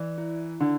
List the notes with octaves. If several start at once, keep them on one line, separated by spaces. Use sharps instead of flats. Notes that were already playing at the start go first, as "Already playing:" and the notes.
Already playing: E3 D5
E4
D3 D4